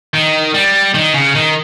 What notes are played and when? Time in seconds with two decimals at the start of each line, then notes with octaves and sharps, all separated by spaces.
0.14 D#3
0.54 G3
0.95 D#3
1.14 C#3
1.35 D#3